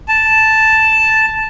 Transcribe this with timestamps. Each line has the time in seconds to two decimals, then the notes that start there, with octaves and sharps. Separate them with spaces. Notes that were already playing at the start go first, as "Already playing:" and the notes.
0.08 A5